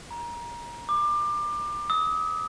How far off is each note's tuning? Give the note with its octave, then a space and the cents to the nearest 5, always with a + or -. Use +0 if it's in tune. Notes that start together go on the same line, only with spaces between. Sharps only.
A#5 +25
D6 +25
D#6 +40